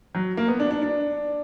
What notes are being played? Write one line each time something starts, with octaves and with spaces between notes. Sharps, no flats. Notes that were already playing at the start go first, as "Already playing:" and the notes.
F#3
A#3
B3
D4
D4
D4